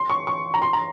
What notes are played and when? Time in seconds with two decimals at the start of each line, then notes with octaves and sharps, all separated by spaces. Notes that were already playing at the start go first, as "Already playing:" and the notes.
Already playing: C6
0.10 C#6
0.27 C#6
0.54 A#5
0.62 C6
0.73 A#5